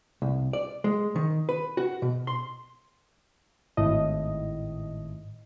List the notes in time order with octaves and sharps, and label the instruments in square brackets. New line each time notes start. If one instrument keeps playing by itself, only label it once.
[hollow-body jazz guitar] C2
D5
G#3
D#3
B4
F#4
B2
C6
[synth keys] G#1 A2 D#5